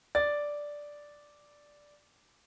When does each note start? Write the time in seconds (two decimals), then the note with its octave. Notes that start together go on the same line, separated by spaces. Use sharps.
0.15 D5 A6